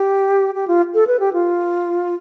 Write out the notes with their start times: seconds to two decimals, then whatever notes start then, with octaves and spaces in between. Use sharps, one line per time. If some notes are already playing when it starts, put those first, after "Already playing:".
Already playing: G4
0.55 G4
0.68 F4
0.94 A4
1.07 B4
1.20 G4
1.33 F4